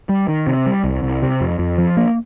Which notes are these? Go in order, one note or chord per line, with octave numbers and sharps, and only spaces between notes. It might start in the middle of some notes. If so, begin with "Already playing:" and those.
G3
D#3
C3
G3
C2
C2
C3
F2
F2
F3
A#3